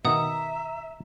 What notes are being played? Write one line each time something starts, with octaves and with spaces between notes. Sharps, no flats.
B2 D#3 E5 F#5 A#5 D#6